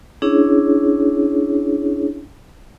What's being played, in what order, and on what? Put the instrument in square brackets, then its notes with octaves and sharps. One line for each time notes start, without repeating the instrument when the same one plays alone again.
[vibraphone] C#4 D4 E4 G#4 C#5